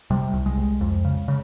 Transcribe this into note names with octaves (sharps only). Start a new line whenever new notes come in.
C3 G3
C2
G#3
C2
F2
C#3
C#3